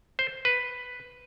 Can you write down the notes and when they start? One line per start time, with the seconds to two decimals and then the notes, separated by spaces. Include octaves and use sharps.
0.19 C5
0.45 B4